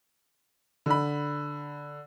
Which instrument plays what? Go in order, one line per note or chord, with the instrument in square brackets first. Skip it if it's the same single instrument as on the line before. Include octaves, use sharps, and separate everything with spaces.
[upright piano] D3 B5